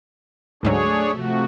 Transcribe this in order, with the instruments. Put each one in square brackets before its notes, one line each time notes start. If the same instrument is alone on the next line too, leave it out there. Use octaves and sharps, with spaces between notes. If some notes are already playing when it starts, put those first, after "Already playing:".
[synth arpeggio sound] D2 G#2 F#3 [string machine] A3 [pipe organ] D4 G#4 C#5
[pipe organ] C3 F3 F#4